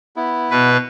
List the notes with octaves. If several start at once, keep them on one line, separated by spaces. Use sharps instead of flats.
B3 E4
B2 B4